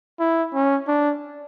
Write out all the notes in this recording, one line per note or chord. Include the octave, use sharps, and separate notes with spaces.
E4
C#4
D4